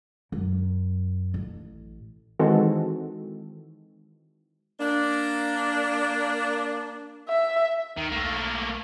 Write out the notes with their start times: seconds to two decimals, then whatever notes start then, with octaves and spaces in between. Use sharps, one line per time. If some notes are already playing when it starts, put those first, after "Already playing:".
0.32 F#2
1.34 A1
2.40 D#3 E3 G#3 C4 F#4 A4
4.80 A#3 D4
7.29 E5
7.97 D#2 D#3
8.12 B1 A3 A#3